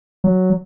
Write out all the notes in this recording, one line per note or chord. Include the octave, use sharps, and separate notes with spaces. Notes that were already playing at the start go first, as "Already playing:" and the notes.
F#3